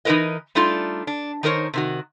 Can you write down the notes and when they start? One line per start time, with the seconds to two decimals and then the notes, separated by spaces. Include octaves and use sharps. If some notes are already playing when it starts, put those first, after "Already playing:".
0.05 E3 D#4 E4 A#4 B4 D#5
0.55 G3 A3 D4 D#4 F4
1.07 D4
1.43 D#3 D#4 A#4 C5 C#5
1.74 C3 D#3 F#4